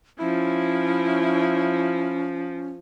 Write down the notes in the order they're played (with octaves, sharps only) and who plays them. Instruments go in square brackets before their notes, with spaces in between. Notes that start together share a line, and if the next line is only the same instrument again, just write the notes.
[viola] F3 [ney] C#4 [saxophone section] E4